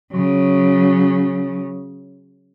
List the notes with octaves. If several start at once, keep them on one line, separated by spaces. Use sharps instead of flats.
C#3 F#3